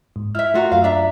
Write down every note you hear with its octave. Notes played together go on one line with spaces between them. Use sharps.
G#2
E4 E5 F6
A3 F4 F#4 A#4
F#2 F4 F5
D4 E5 A#5